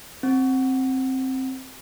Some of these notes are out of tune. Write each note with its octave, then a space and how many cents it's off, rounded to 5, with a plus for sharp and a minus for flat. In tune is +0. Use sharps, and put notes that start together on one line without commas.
C4 +5